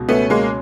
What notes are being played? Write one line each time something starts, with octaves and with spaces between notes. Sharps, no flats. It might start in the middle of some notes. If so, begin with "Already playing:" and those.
Already playing: C#2 B2
A3 B3 C#4
G#3 A#3